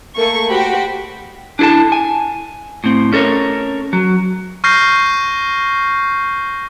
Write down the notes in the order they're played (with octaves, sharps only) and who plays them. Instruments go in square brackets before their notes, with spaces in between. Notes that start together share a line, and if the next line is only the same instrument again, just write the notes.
[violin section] A3 A#3 C#6
F#4 G4 C5 B5
[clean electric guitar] D4 E4 G#4 A4 A5
G#5
A2 C4
C#4 A4 A#4 C#5
F#3
[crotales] C#6 F6 G6 A#6 C7